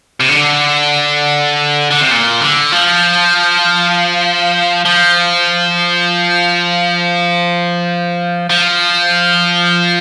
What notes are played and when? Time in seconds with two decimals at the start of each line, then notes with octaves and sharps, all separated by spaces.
0.20 C3
0.29 D3
1.91 D3
2.01 C3
2.11 A#2
2.41 D3
2.72 F3
4.85 F3
8.50 F3